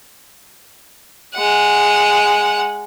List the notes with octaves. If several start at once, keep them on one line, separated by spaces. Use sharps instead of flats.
G#3 F#5